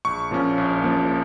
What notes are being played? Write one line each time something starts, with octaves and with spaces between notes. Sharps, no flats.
A#1 C#6
A#2 F3 A#3 C#4
A#1
A#2 F3 A#3 C#4